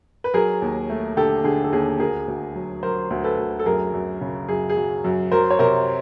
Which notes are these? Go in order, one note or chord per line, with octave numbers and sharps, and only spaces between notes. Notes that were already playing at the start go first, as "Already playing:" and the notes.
B4
F#3 G#4 A#4
D#2
A3
D3 G4 A4
D3 G#4
A4
D#2 G#4
D2 G#4 A#4
D2
F#3
F#3 A#4 C5
D2
A4 B4
D2
A4
F#2 G#4 A#4
F#2
C#3
F#2 G#4
G#4
F#3
F#2
F#3 A#4 C5
C#5
C3 A#4 C5